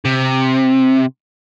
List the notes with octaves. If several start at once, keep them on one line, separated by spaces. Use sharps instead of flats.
C3